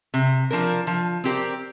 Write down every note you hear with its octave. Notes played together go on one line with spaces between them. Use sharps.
C3
F3 D4 A#4
F3
C4 G4 A#4 D5